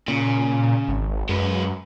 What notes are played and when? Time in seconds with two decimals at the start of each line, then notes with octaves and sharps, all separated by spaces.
0.08 A#2 C#3
0.88 G#1
1.29 F#2 G#3 B4